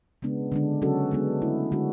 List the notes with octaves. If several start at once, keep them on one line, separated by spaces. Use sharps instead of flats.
C#3 G#3 B3 D4
D3 G#3 D4
C#3 F#3 C#4 F#4 A4
G#3 B3 D4
D3 A3 E4
D3 G#3 D4 F#4